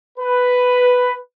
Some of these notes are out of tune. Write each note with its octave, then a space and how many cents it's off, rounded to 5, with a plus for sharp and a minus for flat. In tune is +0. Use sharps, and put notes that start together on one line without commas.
B4 +5